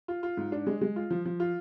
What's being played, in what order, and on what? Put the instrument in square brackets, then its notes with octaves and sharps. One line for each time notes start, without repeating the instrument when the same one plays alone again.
[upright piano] F4
F4
G#2
D4
G#3
G#3
F4
F3
F3
F4